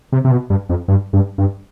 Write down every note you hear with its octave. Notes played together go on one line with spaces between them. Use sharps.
C3
C3
B2
G2
F2
G2
G2
G2